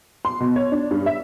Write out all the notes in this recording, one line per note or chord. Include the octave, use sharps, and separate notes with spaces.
C6
B2
C#5
D4
G2
E5